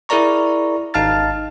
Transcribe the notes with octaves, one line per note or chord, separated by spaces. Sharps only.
E4 G#4 A#4 D5 A#5 C#6
G#1 D#4 F5 A5 F6 A6